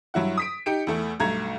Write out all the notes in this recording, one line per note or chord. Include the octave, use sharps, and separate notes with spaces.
G2 F#3 E4 F#5
D#6 B6 D7
D#4 G4 C#7 D7
E2 A3
B1 G2 A3 A#5 G#6